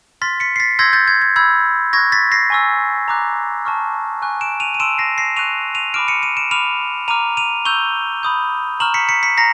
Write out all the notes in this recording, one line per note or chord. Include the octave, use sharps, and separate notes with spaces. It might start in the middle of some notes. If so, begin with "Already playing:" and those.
C6 F6 A6 B6
B6 C#7
C7
A6 B6
C6 E6 G6 G#6 A#6
G6 A6
G#6
G#6
B5 E6 G6 G#6
C#6 F#6 G#6 A#6
A6 B6
A#6 C7
G#5 C#6 E6
A#5 D6 F#6
A5 C#6 F6
G#5 C#6 F#6
D7 E7
D#7 F7
D#7
A5 C6 E6 D7 E7
A#6 C7
A#6 C7
C#6 F#6 D#7 F7
D#7 F7
B5 D6 F6 D7 E7
C#7 D#7
C#7 D#7
D7 E7
B5 D6 F6 D#7 F7
A#5 D6 F6 D#7 F7
D#7 F7
C#6 E6 G6 F7 G7
B5 D#6 G6
A#5 C#6 F6 E7 F#7
B6 C#7
B6 C#7
B6 C#7
A#5 A#6 C7